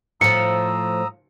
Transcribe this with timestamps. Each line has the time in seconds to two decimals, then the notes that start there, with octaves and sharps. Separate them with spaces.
0.21 A2 F3 A#5 D#6 E6 C#7